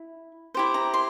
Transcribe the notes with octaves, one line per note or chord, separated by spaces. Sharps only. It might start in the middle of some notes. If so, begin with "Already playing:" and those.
Already playing: E4
E4 G4 C5
A#5
C6